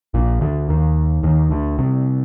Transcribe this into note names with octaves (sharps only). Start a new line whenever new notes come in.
A#1 A#2
D2 D3
D#2 D#3
D#2 D#3
D2 D3
C2 C3